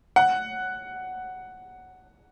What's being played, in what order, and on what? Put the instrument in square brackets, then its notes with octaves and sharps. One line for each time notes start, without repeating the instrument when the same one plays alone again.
[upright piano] F#5